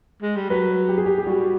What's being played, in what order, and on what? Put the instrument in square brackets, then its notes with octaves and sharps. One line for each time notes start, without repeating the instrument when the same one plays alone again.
[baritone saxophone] G#3
G3
[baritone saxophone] F#3 [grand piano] B4
[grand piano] G4
G#4
G4
G4
[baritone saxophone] G3 [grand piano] F#4